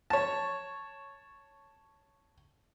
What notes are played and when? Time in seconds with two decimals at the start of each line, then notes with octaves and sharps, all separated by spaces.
0.10 C#5 A5